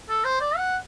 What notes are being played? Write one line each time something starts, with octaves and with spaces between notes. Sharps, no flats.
A4
C5
D5
F#5